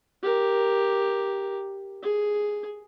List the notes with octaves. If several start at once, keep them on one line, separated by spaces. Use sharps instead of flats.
G4 A#4
G#4